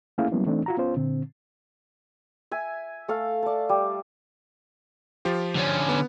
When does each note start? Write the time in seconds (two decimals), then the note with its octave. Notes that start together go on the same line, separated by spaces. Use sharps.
0.18 A3 A#3 C#4 E4 G#4 F5
0.31 F#3 G3 A#3 B3 C#4 E4
0.46 E3 A3 C4 D4 D#4
0.66 F4 F#4 A#5
0.78 B3 C#4 F4 C5
0.96 A#2 D3 C4
2.51 E5 G#5
3.08 A3 A4 F5
3.43 D5 A5
3.69 G3
5.25 F3 F4 G4
5.56 D3 C#4
5.89 B3